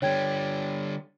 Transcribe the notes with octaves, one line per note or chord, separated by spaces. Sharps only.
D3 G3 C#5 G5 G#6